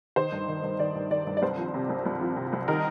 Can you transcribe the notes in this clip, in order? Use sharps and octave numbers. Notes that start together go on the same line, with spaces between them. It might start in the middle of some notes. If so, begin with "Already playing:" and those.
D#3 C5
G2
D#3
G2
D#3 D5
G2
D#3 D5
G2
D5
C2 C5
F3
C3
C2
C2
F3
C3
C2
D#3 A#4